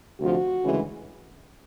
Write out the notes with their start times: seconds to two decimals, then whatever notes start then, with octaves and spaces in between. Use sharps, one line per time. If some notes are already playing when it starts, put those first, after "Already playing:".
0.20 D2 C3 F3 F#4
0.64 D2 C#3 E3 G#3 C#4